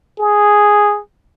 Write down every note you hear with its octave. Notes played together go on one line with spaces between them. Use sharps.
G#4